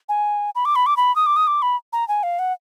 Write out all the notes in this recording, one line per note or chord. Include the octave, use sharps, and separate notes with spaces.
G#5
B5
D6
B5
D6
B5
D#6
D6
D#6
D6
B5
A#5
G#5
F5
F#5